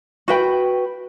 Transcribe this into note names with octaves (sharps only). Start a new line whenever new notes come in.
F#4 B4 G5